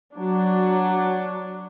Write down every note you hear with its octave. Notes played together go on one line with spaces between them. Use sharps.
F#3 D4